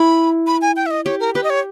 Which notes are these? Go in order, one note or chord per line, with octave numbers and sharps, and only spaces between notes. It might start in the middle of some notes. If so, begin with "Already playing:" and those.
Already playing: E4 B5
B5
G#5
G5
E5
D#5
G4 C#5
A#4
G4 B4
D#5
C#5